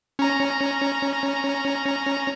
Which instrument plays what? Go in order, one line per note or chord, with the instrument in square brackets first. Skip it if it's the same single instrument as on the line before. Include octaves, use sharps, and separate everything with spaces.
[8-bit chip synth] C#4 A#5